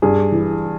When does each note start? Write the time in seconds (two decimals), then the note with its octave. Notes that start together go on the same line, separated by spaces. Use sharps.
0.02 G2 G#4
0.32 E3